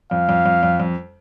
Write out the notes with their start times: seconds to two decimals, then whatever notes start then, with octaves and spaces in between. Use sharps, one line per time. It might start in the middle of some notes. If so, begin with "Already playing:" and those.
0.11 F2 F5
0.29 F2
0.46 F2
0.63 F2
0.80 F2